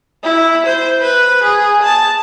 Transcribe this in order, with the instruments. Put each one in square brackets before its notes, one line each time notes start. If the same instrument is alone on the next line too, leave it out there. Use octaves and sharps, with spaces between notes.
[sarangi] E4
C5
B4
G#4
A5